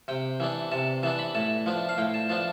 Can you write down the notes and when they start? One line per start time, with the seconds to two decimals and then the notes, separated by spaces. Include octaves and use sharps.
0.08 C3 G5
0.40 E3 B3 D4
0.72 C3 A5
1.03 E3 B3 D4 A5
1.19 B5
1.35 A2 A5
1.66 F3 B3 D4
1.89 F5
1.98 A2 G5
2.14 A5
2.29 F3 B3 D4 A5